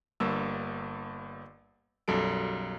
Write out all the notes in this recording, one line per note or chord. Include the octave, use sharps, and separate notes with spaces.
G1 G2 A#3 E6
B1 F#2 G3 A4 D7